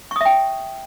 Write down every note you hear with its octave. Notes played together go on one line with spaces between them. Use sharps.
E5 G5 C#6 D#6